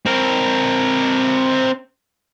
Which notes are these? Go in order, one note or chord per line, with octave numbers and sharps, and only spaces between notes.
C4 A#4